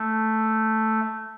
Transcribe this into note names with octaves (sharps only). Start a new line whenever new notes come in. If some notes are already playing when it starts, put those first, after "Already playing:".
Already playing: A3